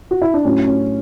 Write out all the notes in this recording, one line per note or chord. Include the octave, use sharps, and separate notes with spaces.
F#4
E4
D4
A2 F#3 C#4
C#4